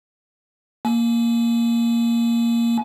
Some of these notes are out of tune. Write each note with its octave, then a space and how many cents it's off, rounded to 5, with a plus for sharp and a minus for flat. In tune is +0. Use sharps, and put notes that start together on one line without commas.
A#3 +0 G#5 +30